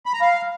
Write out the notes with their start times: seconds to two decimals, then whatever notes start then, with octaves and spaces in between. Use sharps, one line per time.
0.06 B5
0.13 A#5
0.21 F5